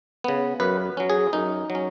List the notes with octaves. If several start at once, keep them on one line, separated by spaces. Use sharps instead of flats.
C#3 B3
F#2 B4
F#3 C#4
G#4
F#2 D#4
F#3
C#4